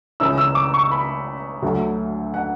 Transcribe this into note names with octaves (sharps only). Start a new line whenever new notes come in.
C#2 C#3 E3 E6
E6
D6
C#6
B5
D2 D3 F#3 A3
F#5